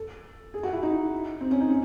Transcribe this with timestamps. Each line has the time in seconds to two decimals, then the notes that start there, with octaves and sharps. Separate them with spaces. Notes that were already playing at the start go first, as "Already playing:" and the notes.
Already playing: A4
0.54 G#4
0.63 F#4
0.73 E4
0.83 D#4
1.41 C4
1.51 C#4
1.61 D#4
1.70 C#4